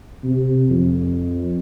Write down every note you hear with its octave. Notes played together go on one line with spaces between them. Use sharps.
C3
F2